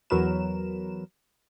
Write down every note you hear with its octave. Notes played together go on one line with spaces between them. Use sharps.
E2 F#3 A#4 B4 E7